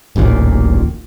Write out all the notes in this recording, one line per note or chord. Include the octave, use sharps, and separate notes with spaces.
D1 A1 D#2 A#2